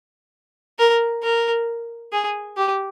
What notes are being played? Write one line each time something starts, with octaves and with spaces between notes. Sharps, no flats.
A#4
A#4
G#4
G4